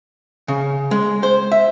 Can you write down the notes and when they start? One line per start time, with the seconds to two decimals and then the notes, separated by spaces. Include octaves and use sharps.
0.48 C#3
0.91 G#3
1.23 C5
1.52 E5